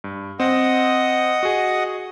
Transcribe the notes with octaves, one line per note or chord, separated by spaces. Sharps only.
G2
C4 D#5 F#5 D#6
F#4 G#4